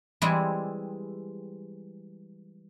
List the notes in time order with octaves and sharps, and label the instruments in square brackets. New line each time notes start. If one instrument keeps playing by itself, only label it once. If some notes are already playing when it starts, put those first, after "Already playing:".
[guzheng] E3 G3 G#3 C4 E4 G#4